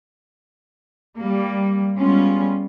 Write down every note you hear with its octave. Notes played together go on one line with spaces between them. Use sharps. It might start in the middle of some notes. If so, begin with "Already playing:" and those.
G3 A#3
G3 G#3 B3 C#4 F4